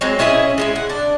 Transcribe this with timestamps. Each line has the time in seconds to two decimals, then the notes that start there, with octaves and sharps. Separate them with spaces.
0.01 F#3 G#3 C4
0.19 C#4 E4 G#4 D#5
0.58 G#3 A#3 E4
0.76 F#5
0.90 D4